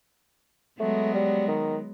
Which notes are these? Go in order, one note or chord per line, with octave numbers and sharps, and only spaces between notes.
F#3 G#3 A3 B3
G3
D#3